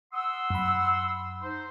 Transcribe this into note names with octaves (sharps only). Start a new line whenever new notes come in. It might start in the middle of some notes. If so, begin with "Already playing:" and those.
F#5 C6 D#6 E6
F#2 B5
D#4 C5